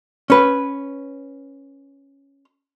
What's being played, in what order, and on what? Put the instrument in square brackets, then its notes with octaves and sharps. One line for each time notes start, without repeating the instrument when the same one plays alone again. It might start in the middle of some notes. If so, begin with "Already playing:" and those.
[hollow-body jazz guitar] C#4 B4